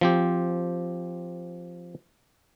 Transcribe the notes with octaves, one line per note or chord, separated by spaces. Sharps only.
F3 C4 G4